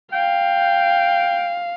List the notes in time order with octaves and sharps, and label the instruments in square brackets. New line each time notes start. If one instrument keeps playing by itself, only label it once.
[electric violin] F5 [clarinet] G5